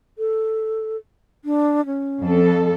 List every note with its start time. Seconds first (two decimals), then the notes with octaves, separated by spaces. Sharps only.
0.18 A4
1.45 D4
1.86 C#4
2.22 F2 A4